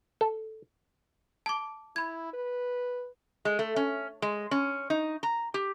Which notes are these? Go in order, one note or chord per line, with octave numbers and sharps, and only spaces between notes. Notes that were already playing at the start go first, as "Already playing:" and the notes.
A4
A5 D6
E4 B5 G#6
B4
G#3
A3
C#4
G#3
C#4
D#4
A#5
G4